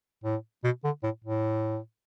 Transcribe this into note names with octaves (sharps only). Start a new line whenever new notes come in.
A2
B2
D3
A2
A2